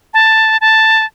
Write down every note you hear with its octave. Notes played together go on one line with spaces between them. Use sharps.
A5
A5